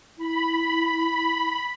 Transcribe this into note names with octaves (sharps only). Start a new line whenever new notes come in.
E4 B5